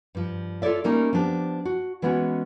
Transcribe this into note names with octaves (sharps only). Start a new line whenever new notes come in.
G2 F3
F4 A4 B4 C#5 D5 E5
G3 A3 A#3 C#4 D#4
F3 B3 D4 G4
F#4
E3 G#3 B3 C#4 D4 F#4